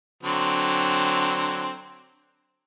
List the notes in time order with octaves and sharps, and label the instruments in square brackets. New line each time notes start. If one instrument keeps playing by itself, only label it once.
[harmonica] D3 F#3 C4